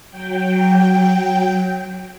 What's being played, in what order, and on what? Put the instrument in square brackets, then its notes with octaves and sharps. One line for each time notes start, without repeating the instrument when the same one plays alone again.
[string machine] F#3 G5